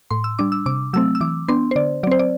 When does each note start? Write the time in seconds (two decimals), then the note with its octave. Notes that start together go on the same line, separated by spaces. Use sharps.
0.11 A2 C6
0.24 E6
0.39 G3 D4 D6
0.52 E6
0.66 C3 D6
0.93 F#3 A3 C4 E6
1.15 E6
1.21 E3 D6
1.48 B3 D4 C6
1.71 C5
1.76 D3 D5
2.03 F#3 D5
2.07 C4 C5
2.19 D5